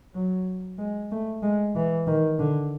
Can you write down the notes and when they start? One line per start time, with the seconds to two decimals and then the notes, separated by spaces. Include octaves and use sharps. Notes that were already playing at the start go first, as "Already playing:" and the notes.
0.15 F#3
0.78 G#3
1.11 A3
1.43 G#3
1.75 E3
2.07 D#3
2.39 D3